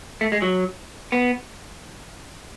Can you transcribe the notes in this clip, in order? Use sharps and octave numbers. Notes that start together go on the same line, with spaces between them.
A3
G#3
F#3
B3